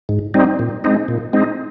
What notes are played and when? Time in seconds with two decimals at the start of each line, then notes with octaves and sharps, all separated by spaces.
0.09 G#2
0.34 G3 C4 D#4
0.59 A#2
0.84 G#3 C4 D#4
1.08 A#2
1.33 G#3 C4 D#4